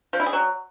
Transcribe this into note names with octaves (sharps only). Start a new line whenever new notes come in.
F3
E4
G#4
F#3